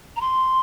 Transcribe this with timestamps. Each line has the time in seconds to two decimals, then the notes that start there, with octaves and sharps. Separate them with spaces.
0.16 A#5
0.21 C6